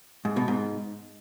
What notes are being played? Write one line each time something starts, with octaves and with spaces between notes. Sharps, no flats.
G#2
B2
G#2